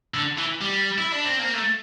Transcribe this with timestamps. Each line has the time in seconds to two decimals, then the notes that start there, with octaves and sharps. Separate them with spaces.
0.14 D3
0.38 E3
0.61 G3
0.98 E4
1.13 D4
1.26 C4
1.40 A#3
1.54 A3